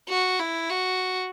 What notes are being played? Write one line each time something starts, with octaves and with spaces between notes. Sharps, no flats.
F#4
E4
F#4